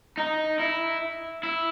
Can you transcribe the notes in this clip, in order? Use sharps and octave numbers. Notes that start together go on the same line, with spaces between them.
D#4
E4
E4